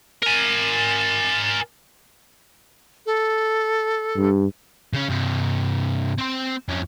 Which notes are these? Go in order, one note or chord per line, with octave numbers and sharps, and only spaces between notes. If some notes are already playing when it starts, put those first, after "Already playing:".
A#4 G#5
A4
G2
C#3 C#4
G2 C3
C4 C5
F2 C#4